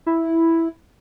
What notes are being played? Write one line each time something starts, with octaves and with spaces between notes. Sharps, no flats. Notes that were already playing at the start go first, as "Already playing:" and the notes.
E4